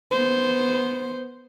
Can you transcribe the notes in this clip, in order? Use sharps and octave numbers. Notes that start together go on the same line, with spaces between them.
B3 C5